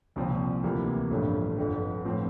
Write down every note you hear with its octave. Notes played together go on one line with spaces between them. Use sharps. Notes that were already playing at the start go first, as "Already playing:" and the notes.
C2 A#2 F3 C4
D2 C3 E3 A#3
A1 G2 F3 A3
G1 F2 D3
A2 F3 C4